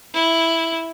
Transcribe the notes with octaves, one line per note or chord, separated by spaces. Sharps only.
E4